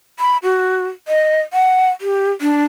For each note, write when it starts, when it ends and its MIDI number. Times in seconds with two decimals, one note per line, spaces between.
0.19 0.37 83
0.43 0.87 66
1.08 1.40 75
1.53 1.89 78
2.01 2.31 67
2.41 2.64 62